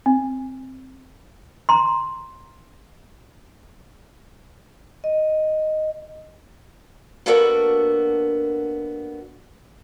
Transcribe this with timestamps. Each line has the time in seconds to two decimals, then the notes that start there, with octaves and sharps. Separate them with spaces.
0.06 C4
1.69 A#5 C6
5.04 D#5
7.26 A#3 B3 D4 F#4 A4 A#4